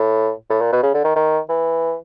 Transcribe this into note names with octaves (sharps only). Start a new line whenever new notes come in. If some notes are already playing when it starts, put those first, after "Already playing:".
Already playing: A2
A2
A#2
B2
C#3
D3
D#3
D#3
E3